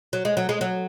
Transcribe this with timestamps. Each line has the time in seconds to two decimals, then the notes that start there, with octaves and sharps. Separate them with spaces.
0.13 F#3
0.25 G#3
0.37 F#3
0.49 G#3
0.61 F#3